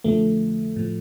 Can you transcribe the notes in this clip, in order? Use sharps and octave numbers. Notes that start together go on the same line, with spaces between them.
F2 D3 F3 A3
A2 F3